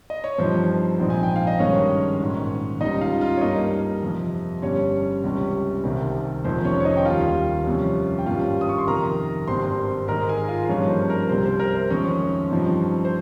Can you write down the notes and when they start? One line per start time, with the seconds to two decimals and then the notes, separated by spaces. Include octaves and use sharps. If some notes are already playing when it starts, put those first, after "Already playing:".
0.10 D#5
0.24 C#5
0.38 G2 F3 C4 D#4 C5
0.99 A#1 G#2 F3 C4 D#4
1.10 G#5
1.23 G5
1.36 F5
1.47 D#5
1.59 G2 D#3 G#3 C#4 C#5
2.20 A#1 G#2 D#3
2.81 C#2 C#3 G3 D#4 D#5
3.01 F4 F5
3.21 F4 F5
3.37 C#5
3.41 G2 G3 A#3 D#4 D#5
4.02 F2 C3 F3
4.62 G1 G2 G3 C#4 C#5
5.24 C#2 C3 G3 C#4
5.84 C2 C3 D#3 G3 C4
6.44 F1 F2 D#3 G#3 C5
6.64 C#4 C#5
6.80 C#5
6.85 D#4 D#5
6.97 G5
7.05 D#2 D#3 G3 F4 F5
7.66 F2 C3 G3 C#4
8.19 G5
8.26 G#1 G2 G3 C#4 F4 F5
8.61 D#6
8.69 C#6
8.78 C6
8.87 F2 C3 D#3 A#4 A#5
9.48 G#1 G2 G3 C4 C5 C6
10.08 G#2 D#3 G#3 D#4 A#4 A#5
10.29 G#4 G#5
10.48 F4 F5
10.69 G2 F3 A#3 C#4 D#4 C#5
10.89 C5
11.10 A#4
11.29 C2 C3 G3 C5
11.45 C5
11.59 A#4
11.75 C5
11.90 F2 D#3 G#3 C#4 C#5
12.51 G2 F3 C4 D#4
13.05 C5